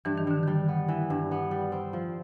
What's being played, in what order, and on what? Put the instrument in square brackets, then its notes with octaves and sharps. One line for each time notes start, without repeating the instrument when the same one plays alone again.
[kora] G2 [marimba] E3
[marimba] D#3
[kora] G2 [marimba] D3
[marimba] D#3 [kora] G3
[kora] B3
E3
G2
B3
G3
C4
F3